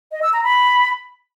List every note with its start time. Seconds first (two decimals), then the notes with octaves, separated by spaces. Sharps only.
0.12 D#5
0.23 E6
0.33 A#5
0.44 B5